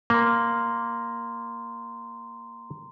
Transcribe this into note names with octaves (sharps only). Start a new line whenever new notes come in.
A#3 A#5 C6